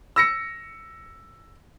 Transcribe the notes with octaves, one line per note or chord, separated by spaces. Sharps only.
E6 A#6 C#7